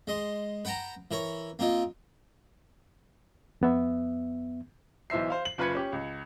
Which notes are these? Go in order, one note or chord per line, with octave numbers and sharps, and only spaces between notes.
G#3 D#5 C6
B4 F#5 G5 A5 A#5
E3 A#4 C#5
A#3 C4 F4 D#5
F2 B3 E5
B1 E3 C5 E5 C7
C5 F5
F#7
F#1 F4 B4 B5 G#6 C#7
C#4 G4
C#2